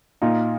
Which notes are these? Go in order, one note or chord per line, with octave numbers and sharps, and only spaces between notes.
A#2 D#4 F4